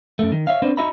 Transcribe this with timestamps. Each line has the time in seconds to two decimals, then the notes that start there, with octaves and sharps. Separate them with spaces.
0.19 F#2 A3
0.32 D#3
0.47 C#5 E5 F5
0.62 B3 C4 D4 B4 C5 D5
0.77 D#4 F#4 D#5 E5 A#5 B5